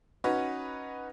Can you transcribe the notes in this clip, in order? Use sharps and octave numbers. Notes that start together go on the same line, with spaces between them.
C#4 D#4 F#4 B4